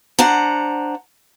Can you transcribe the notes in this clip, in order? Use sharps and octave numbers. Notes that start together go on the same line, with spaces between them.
D4 C5 F#5 A#5